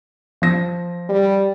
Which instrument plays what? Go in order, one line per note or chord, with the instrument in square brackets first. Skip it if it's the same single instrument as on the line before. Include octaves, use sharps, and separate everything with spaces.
[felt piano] F3 A#6
[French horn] G3